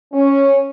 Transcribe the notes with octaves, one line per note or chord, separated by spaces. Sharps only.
C#4